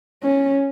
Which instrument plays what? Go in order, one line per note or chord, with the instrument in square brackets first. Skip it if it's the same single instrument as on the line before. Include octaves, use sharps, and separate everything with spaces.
[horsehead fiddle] C#4